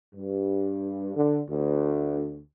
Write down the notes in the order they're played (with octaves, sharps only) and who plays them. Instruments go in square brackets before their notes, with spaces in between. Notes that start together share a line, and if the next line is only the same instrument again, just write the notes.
[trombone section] G2
D3
D2